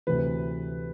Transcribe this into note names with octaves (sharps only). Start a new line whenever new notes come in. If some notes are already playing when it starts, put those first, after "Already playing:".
D2 C3 E3 B4